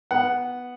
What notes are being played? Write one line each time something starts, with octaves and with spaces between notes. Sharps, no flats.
B3 F#5